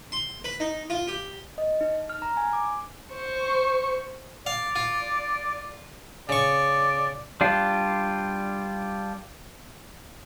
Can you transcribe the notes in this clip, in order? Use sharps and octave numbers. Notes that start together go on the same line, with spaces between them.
C6
B4
D#4
F4
G4
D#5
D#4
F6
A#5
G#5
D6
C5 C#6
D5 F5
F4
C#3 D5 C#6
G3 D4 F4